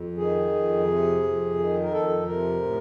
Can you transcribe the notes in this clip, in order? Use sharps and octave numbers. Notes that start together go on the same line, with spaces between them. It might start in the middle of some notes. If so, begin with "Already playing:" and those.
Already playing: F2
D#3 G#4
F2
C3
F2
D#3
A#4
F2 A4
C3 A#4
A2